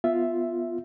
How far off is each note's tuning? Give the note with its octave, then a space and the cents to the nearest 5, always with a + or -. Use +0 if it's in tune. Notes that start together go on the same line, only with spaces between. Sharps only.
B3 +0 F4 +0 E5 +0